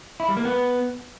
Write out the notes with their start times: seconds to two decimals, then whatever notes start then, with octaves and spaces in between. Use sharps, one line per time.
0.20 E4
0.28 G3
0.37 A#3
0.45 B3